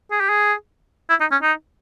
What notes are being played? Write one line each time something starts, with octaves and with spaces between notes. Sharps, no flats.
G#4
G4
G#4
E4
D#4
C#4
D#4